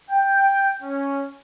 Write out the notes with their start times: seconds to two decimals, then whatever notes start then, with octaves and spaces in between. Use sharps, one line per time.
0.10 G5
0.82 C#4